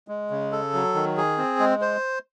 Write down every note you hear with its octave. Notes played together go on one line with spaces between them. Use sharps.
G#3
C#3
A4
F#3
D#3
G#4
C4
G#3
C5